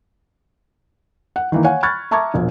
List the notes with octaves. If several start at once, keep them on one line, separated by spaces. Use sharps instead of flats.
F#5
D#3 E3 A#3
C#5 F5 F#5 G#5
B5 C#6 F6 F#6 G#6 A6
E5 A5 A#5 C#6 D6 G#6
E1 A#1